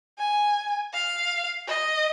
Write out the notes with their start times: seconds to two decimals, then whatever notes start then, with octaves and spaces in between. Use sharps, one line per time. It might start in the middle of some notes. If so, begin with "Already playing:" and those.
0.18 G#5
0.93 F5
1.68 D#5